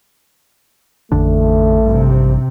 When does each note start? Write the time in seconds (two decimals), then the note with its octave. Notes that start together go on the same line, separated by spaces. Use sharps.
1.12 A1 F2 D3 A3 D4
1.86 G2 C3